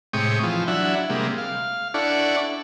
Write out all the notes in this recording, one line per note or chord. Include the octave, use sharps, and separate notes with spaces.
A2 C3 G#3 G5 C#6 D#6
E3 F3 F4
F#3 D4 E4 E5 F#5
C3 G3 G#3 A#3
F5
D4 E4 A4 D5 F#5 C#6